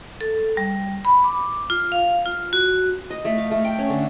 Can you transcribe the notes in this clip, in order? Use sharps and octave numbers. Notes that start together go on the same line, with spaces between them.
A4
G3
B5
D6
F4
F5
F4
F#4
D#5
A3
F5
A3
G5
C#4
D3